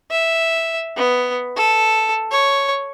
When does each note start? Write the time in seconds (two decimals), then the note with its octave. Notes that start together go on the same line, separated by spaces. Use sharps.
0.10 E5
0.97 B3
1.56 A4
2.31 C#5